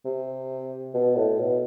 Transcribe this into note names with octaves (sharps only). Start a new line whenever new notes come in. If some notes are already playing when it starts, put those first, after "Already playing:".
C3
B2
A2
B2